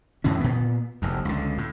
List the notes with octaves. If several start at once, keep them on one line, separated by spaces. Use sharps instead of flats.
F#2 A2 E3 C#4
A#2 B3
F1 D#2
C#2 D3
A2